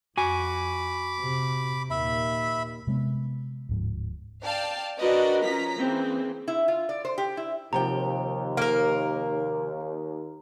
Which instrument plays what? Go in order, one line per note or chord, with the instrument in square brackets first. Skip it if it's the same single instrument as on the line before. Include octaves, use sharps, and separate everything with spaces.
[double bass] F2 [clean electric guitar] F#4 G#5 [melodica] B5 D6
[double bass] C3
[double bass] D#2 A#2 [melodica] E5 B5
[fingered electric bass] C3 G#3 A3 B3
D1 G#2 F3
[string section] D5 F5 G5 A5
D4 F#4 A#4 B4 D5 D#5
F3 C#4 A#5 B6
C#3 E3 A#3 C4
[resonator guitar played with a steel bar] E4
F4
D5
C5
G4
E4
[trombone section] D#2 [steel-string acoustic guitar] C3 F3 G5 [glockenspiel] A#5
[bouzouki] A#3 A#4